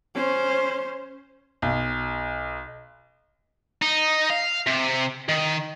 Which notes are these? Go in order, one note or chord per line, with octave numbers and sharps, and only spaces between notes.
C#4 C5
B1
D#4
F5
C3
D#3